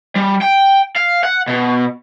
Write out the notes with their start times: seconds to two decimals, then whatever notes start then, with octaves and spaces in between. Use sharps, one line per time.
0.16 G3
0.42 G5
0.96 F5
1.23 F#5
1.48 B2